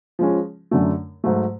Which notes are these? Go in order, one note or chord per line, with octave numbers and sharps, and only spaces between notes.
F3 G#3 C#4
F#2 D3 F#3 A3
G#2 F#3 A3